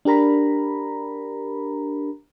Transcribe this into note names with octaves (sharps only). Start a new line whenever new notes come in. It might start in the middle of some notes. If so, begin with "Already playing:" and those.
D4 G4 A#4 A#5 B5